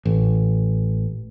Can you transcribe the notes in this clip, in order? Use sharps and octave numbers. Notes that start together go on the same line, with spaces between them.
A1